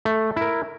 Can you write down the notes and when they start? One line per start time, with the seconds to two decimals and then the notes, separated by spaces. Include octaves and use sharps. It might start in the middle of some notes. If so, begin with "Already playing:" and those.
0.05 A3
0.36 E4 A#4